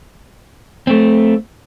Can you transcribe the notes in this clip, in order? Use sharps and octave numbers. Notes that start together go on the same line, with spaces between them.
A3 C4